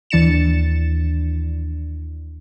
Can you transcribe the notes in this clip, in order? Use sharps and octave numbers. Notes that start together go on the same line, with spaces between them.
D#2 E3 D4 A6 C#7 E7